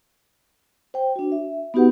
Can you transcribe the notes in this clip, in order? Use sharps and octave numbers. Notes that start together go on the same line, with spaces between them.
C5 G5
D4 F#4
E5
B3 D#4 F#4 G4 B4 F#5